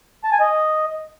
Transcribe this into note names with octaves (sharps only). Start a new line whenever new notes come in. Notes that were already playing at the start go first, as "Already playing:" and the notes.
A5
G#5
D#5